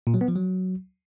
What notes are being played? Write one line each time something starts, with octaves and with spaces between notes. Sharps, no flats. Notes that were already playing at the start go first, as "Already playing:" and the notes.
A#2
F#3
B3
F3
F#3